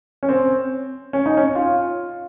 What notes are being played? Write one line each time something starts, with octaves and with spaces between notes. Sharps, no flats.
C#4
C4
C#4
D#4
C#4
F4